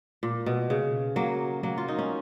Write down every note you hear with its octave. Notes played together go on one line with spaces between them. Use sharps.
A#2
B2
C#3
F#3 A#3
F#3 A#3
F4
D#4
C#4